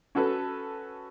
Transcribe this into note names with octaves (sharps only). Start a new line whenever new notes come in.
C#4 F#4 A4 B4